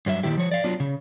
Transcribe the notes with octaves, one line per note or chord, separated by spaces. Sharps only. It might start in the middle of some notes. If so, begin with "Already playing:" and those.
G2 F#3 E5
A#2 D#3 E4 G4
F3 C#5
D5 F5
F#3 B3 D4 F4
C#3